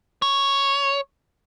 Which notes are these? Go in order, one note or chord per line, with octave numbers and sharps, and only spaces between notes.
C#5